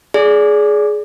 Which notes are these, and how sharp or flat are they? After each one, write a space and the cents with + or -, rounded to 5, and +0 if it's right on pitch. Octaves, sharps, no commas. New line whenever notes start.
G#4 +15 D5 -20